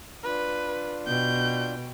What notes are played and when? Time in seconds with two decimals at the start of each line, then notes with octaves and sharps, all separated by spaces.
0.23 D4 F4 B4
1.07 B2 G5 G6